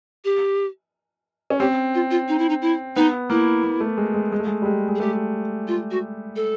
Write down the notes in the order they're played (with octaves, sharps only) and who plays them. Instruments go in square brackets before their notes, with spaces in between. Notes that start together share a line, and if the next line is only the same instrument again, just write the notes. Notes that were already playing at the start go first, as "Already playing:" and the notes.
[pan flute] G4
[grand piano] C#4
[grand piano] C4 [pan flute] G4
[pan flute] F4
F4
D#4
E4
D#4
E4
[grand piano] B3 [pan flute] D#4
[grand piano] A#3 [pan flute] E4
[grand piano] A#3
A3
G#3
G#3
G#3
A3
G#3
G3
G#3
G#3
[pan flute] G#4
[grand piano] A3 [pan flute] G4
[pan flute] F4
F#4
A4